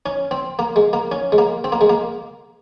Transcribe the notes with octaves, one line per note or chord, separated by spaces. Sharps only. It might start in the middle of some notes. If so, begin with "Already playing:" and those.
C#4
C4
A#3
G#3
A#3
C#4
G#3
A#3
C4
A#3
G#3
A#3